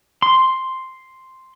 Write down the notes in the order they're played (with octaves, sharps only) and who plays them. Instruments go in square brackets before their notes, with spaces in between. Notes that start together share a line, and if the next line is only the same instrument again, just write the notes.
[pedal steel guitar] C6